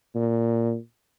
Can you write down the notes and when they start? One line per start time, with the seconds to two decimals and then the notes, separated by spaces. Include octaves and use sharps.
0.15 A#2